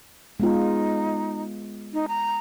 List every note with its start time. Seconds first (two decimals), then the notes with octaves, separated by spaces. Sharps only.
0.40 G#3 B3 D#4 F4
1.94 D#4
2.08 A#5